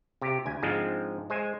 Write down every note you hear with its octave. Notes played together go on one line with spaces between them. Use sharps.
C3 G4
D2 G#5
G#2 F3 G#3 C4 D4
G#3 C5 G#5